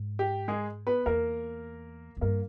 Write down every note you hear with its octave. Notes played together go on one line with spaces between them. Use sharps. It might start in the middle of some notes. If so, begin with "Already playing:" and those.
Already playing: G#2
G4
G#3 G#4
B3 B4
E2 A#3 A#4
E2
G2 A#3 A#4